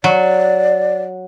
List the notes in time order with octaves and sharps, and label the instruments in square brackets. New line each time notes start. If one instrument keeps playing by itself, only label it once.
[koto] F#3 [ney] D5